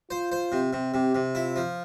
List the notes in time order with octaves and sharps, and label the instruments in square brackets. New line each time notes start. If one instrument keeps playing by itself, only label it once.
[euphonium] F4 [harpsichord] C5
[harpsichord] C5
C3
C3
[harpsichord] C3 [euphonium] G4
[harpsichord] C3
[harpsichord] E4 [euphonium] F4
[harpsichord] F3